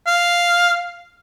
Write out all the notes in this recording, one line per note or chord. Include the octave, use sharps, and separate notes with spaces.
F5